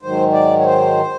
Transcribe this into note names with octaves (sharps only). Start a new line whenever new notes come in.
G#2 D#3 F#3 C5
D5
C#5
C5